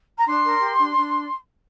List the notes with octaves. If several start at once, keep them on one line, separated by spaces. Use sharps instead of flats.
A#5
D4 C6
A#4
G4
D4
D4